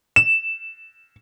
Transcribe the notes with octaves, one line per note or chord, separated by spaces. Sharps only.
E7